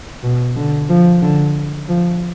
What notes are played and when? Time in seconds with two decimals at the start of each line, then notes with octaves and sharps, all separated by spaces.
0.23 B2
0.57 D3
0.89 F3
1.22 D3
1.88 F3